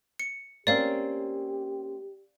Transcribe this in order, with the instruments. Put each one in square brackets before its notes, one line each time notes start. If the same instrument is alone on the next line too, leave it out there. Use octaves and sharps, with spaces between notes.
[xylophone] C#7
[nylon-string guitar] A#3 C4 C#4 [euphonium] G4 [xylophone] D5 F5